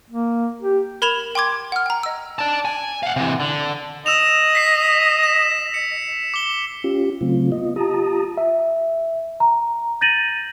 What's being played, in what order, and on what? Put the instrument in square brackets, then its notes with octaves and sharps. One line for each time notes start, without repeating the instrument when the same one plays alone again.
[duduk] A#3
G4
[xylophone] A#4 B5 G#6 E7 F7
G5 C6 D6 G#6
F#5 F6
G5 A#5
D#5 E6
[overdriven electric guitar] D5 A5
G#5
F5 F#5
C3 E3
D3
[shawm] D#5 [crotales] E6 E7 F7
[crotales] B6 C7
E7
C#7
D6 G7
[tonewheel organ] C#4 F4 G4
C#3 F#3 A3 C4 F4
B3 F4 D#5
F4 G4 A5 A#5 D#6
[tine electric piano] E5
[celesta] A#5
G6 A6 A#6 D#7 F#7